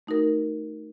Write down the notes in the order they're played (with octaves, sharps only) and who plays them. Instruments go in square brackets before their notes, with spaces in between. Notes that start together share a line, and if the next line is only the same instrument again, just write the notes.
[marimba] A3 D#4 F#4 A#4